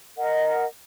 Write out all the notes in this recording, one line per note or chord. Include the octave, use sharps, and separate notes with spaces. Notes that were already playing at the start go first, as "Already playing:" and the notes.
A#4 D#5 F#5